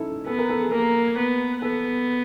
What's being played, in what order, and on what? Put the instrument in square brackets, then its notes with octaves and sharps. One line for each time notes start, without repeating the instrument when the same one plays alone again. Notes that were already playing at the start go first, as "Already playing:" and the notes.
Already playing: [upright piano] C#4 D#4 E4 A4
[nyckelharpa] B3 [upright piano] A4
[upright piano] A#4
A4
G#4
[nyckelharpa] A#3 [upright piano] A#4
[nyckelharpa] B3
[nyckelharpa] B3 [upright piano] A4